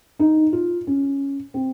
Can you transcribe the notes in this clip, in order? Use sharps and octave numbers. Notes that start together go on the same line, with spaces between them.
D#4
F4
C#4
C4